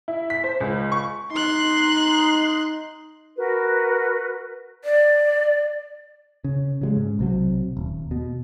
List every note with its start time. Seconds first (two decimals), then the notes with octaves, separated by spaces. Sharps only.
0.08 E4
0.30 B6
0.44 C5
0.61 C#2
0.92 C#6
1.32 D#4 C6 F#6
3.36 F#4 A#4 B4
4.85 D5
6.44 C#3
6.81 C#3 F#3 G#3
6.97 G#2
7.19 B1 C3 F#3
7.77 D#1
8.11 B2